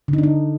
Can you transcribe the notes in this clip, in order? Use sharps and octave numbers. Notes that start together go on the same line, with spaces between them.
D3
D#4
D4
D#4